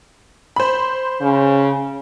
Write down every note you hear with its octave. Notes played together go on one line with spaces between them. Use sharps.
C5 B5
C#3